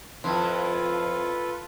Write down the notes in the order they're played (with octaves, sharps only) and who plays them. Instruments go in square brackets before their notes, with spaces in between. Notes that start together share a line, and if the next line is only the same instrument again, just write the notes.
[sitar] F2 E4 [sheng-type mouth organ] F4 A4 B4 [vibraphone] C6